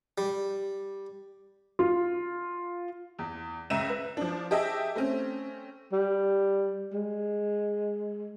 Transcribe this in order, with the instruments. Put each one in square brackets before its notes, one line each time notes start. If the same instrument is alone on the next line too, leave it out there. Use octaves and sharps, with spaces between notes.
[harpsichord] G3
[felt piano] F4
[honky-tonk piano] E2
C#2 E5 A#5 D#7 E7
B4
F3 D4
G4 G#4 D#5 E5 A5
A3 C4 C#4
[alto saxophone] G3
G#3